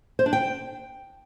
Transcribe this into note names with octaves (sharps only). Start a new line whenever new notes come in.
C5
D4
G5